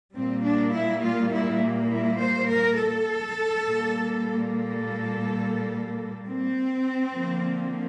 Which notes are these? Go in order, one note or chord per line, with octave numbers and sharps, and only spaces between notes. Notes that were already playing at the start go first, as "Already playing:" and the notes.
A#2 G3 A#3 C4
D4
E4
F4
E4
E4
C5
A#4
A4
A#2 G3 A#3
A4
C4
D3 F3 A#3